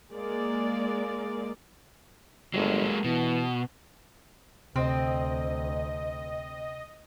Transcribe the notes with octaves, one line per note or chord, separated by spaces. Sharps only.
G#3 A#3 D5
G1 F#3 G#3 A#3
B2 E3
D2 C3 C4 D#5